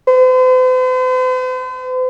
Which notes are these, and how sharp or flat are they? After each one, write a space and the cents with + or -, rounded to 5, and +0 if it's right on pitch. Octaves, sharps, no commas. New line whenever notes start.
C5 -45